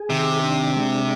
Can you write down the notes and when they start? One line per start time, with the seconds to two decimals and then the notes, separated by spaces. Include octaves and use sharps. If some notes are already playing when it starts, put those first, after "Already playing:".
Already playing: G#4
0.10 C3 D#3
0.43 D4
0.76 G#3